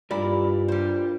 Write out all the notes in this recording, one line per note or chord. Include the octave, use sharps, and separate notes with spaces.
G2 E4 F4 A#4 D5
G3 C5